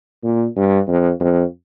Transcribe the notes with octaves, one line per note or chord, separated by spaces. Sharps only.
A#2
G2
F2
F2